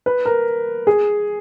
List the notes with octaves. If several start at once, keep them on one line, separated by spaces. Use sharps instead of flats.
B4
A#4
G#4